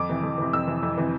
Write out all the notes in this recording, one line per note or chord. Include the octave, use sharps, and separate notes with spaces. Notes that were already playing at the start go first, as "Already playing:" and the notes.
Already playing: F2 D6
C3 E3
F2
C3 E3
F2 E6
C3 E3
F2
C3 E3